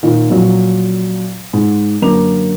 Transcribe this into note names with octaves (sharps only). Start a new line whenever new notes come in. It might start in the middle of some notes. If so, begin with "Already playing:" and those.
A#2 D#3
F2 A#2 F#3
G#2
F#2 D3 A#3 A#5 D6 F7